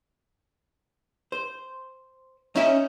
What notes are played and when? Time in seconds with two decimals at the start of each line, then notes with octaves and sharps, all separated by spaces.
1.32 C5
2.55 C#4 D#4 E5